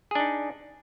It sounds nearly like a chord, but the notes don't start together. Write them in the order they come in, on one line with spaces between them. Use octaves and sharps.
G#4 D4 D#4